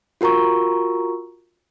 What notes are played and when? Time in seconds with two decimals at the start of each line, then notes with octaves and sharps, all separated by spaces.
0.21 F4 F#4 A#4 A#5 C#6